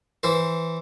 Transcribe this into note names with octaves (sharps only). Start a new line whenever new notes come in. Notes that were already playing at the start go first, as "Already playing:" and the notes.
E3 C5